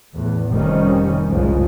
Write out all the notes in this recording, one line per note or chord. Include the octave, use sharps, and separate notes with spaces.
E2 A2
F1 C3 D#3 G3 C#4
F1 C2 G#2 C#3 F3 G#3